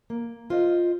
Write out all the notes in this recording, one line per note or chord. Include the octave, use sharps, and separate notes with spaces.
A#3
F4 C5 D#5